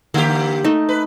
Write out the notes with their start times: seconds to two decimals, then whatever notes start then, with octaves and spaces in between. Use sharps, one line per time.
0.14 D3 A#3 G4
0.64 A3 D#4
0.89 B4